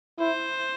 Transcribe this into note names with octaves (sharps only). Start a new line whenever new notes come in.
E4 C5